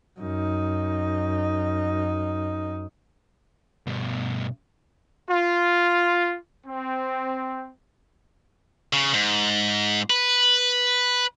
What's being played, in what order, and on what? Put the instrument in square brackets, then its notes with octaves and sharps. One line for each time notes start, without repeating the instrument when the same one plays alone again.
[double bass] F#2 D#4
[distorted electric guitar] G2 B2
[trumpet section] F4
C4
[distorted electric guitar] C#3
G#2
B4